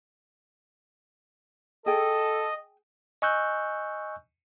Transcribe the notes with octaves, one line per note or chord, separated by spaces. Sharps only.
G#4 A4 D#5 G5
D#5 G#5 C#6 E6 F#6 G6